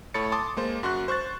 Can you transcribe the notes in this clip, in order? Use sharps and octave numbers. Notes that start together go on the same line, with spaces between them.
A2 A4 C#5 B5 A6 C#7
A5 C6 D6 D#6 A6
G#3 A#3 C5
F#2 F#4 C6 C#6 F#6
C5 C#6 F#6 A6